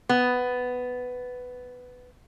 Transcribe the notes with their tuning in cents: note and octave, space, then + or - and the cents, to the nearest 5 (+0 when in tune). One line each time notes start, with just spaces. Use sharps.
B3 +10